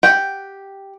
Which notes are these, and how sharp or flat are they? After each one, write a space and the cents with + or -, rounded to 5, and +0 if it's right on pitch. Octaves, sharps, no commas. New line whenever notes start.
G4 +0 F#5 +0